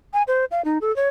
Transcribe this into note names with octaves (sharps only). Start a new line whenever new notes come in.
G#5
C5
F5
D#4
A4
C#5